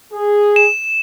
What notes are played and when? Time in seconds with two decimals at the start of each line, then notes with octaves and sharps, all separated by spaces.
0.12 G#4
0.56 E7